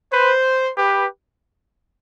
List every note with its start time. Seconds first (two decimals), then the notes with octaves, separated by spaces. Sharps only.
0.13 B4 C5
0.77 G4 B4